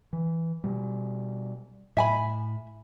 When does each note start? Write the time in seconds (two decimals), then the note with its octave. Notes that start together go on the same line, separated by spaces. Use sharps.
0.13 E3
0.64 B2 G3
1.97 A2 E5 G#5 B5